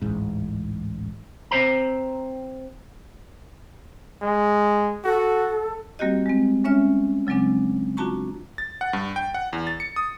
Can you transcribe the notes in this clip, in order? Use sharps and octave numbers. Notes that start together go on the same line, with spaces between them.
D1 A1 G#2
C4 C5 A#5
G#3
F#4 A4
G3 A#3 C4 F#4 G4 D#5
G#3 C4
G#3 C#4 C#5 E5 F6
C#3 F#3 G#3 C4 D4
D4 F4 F#4 A5 A#5 C#6
A6
F#5
G2
G5
F#5
E2
A6
C#7
D#6